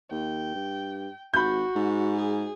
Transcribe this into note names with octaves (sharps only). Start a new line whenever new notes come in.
D#2 G5
G2
G#1 F#4 B5 G6
G#2
G#4